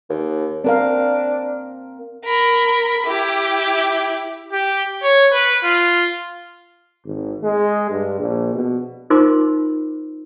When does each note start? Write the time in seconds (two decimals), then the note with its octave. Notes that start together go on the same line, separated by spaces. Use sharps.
0.10 D#2
0.64 C4 D4 A#4 F5
2.25 A#4 B5
3.06 E4 G4
4.53 G4
5.03 C#5
5.33 B4
5.63 F4
7.05 G#1
7.43 G#3
7.90 G2
8.19 A#1
8.54 B2
9.10 D#4 F4 A#4 C5 C6 D6